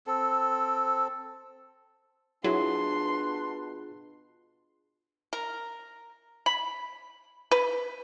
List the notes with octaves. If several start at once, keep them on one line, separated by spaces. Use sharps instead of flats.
C4 A4
B2 F#3 D4 E4 F4 G#4 C6
A#4
B5
B4